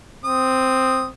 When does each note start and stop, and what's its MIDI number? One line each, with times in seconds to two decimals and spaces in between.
0.25 1.11 60
0.25 1.05 87